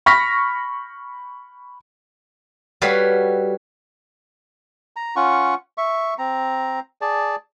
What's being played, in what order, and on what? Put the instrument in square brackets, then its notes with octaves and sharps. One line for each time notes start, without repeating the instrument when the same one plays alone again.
[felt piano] B5 C#6 F6 A#6 B6
[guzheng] G3 F#4 A4 B4 C#5 F5
[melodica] A#5
C#4 F4 F#5 C#6
E5 C#6
C4 A#5
G#4 D5 A5